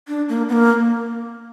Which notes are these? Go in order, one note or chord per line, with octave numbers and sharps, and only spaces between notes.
D4
A#3
B3
A#3